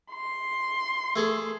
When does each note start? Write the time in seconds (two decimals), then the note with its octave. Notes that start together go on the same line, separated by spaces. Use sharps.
0.12 C6
1.16 A3 G#4 A4